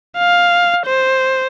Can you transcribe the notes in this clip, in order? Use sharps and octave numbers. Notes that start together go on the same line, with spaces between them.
F5
C5